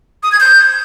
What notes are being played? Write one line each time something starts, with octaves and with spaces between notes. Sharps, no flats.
D#6
G#6
G6